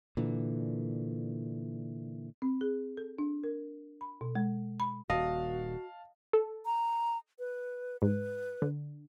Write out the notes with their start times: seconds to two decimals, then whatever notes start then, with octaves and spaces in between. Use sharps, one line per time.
0.17 A#2 D3 E3
2.42 C4
2.61 G#4
2.97 A4
3.18 D4
3.44 A#4
4.01 B5
4.21 B2
4.35 G#3
4.80 B5
5.10 D#1 F#4 D#5 F5 A5
6.33 A4
6.66 A#5
7.39 B4
8.02 G#2 B4
8.62 D3